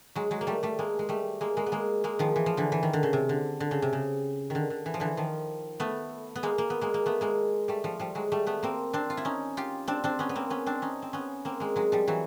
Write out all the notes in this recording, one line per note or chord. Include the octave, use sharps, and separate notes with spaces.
F#3 G#3
F#3 G#3
A#3
G3 A3
G3 A3
G#3 A#3
G#3
G3 A3
G#3 A#3
G#3 A#3
B3
G#3 A#3
G#3 A#3
D#3 F3
E3
F3
D3 E3
E3
D#3
D3
C#3
C3
D3
D3
C#3
C3
C#3
D3 D#3
D3
E3
F3
D3 E3
D#3 F3
A3 B3
B3
G#3 A#3
A#3
B3
G#3 A#3
A#3
A3 B3
G#3 A#3
G3 A3
F3 G3
F3 G3
F#3 G#3
G3 A3
A3 B3
A#3 C4
C4 D4
F4
E4
C#4 D#4
F4 G4
C4 D4
C4 D4
B3 C#4
B3
A#3 C4
B3 C#4
C4 D4
C#4 D#4
C4
B3 C#4
A#3 C4
G#3 A#3
F#3 G#3
F3 G3
E3 F#3